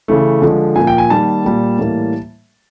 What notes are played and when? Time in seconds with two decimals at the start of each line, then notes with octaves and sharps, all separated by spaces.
0.08 C#3 E3 A3
0.42 D3 F3 G#3
0.76 A#2 F3 A#3 G#5
0.87 G5
0.98 G#5
1.10 D#3 G3 A#3 A5
1.44 A#2 G3 A#3
1.78 A2 E3 G3 A#3